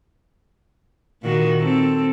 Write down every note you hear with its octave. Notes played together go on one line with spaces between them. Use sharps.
A#2 D#3 F#4
C4 A4